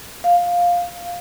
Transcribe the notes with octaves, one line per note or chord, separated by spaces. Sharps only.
F5